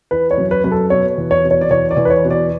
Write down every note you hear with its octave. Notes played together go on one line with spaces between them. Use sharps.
E3 B4
C#5
F#2
B4
F#2 B4
A4
B2 C#5
E2
C#5
B2
C#5
D5
E2 C#5
D5
E2
B4
C#5
B2
D5